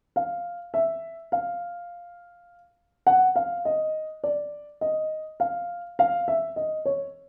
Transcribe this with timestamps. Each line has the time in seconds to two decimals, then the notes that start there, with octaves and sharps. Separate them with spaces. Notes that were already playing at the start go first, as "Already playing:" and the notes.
0.16 F5
0.74 E5
1.32 F5
3.07 F#5
3.36 F5
3.65 D#5
4.24 D5
4.81 D#5
5.40 F5
5.99 F5
6.28 E5
6.56 D#5
6.85 C#5